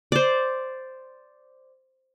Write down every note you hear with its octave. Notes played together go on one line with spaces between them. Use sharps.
C5 D5